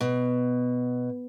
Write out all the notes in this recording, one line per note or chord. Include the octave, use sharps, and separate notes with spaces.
B2